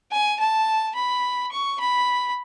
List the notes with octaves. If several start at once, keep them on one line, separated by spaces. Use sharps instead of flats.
G#5
A5
B5
C#6
B5